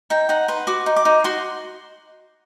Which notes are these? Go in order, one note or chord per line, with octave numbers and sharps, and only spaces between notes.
D#4 G5
D#4 F#5
B4 C6
F#4 D6
D#4
D6
D#4
F#4 C6